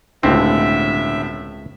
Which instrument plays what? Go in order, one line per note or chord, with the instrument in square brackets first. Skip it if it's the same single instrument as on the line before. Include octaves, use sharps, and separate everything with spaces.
[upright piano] E1 A2 D3 [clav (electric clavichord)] C#2 C4 [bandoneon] E5